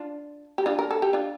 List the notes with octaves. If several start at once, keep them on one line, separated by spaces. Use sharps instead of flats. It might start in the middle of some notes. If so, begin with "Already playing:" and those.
Already playing: D4 F4
G4
D4 F4
A#4
A4
G4
D4 F4